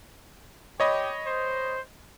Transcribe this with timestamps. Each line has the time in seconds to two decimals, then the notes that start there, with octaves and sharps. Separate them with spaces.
0.80 G4 C#5 D#5 B5
1.27 C5